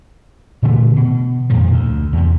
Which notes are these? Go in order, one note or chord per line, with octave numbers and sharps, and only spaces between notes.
A#2 D3 E3 A3
B2
F2 A#2 D#3 F3
D2
E2 C3